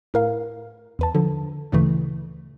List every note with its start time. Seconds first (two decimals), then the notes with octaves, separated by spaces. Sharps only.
0.14 A2 A#4 F5
0.99 E2 B4 A5
1.15 D3 F3
1.72 D2 A#2 C#3 E3 A3